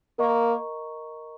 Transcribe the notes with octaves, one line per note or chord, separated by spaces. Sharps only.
A#3 A#4 D#5 A#5 C#6